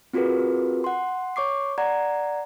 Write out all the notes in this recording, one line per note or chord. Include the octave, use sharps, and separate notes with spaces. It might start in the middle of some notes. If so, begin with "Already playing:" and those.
C4 F4 F#4 G#4 A#4 B4
F#5 C6
C#5 C#6 D6 C7
D5 F#5 A#5 G#6